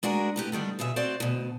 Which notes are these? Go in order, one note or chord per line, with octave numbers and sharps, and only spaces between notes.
G#3 D4 F#4 G#4 A#4
A2 B3 G4
D3 D#3 G3 D4
D#2 B2 G#4 E5
C4 F#4 C5 D5
D2 B2